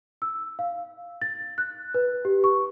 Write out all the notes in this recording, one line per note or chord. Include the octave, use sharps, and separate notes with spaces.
E6
F5
A6
F#6
B4
G4
C#6